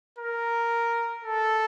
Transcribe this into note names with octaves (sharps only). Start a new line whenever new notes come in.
A#4
A4